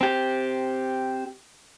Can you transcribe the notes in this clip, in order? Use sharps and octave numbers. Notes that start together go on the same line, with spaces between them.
C4 G4